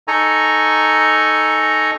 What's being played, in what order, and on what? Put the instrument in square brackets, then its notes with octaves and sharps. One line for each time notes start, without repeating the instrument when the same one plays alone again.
[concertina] D#4 A4 G#5 A#5 C#6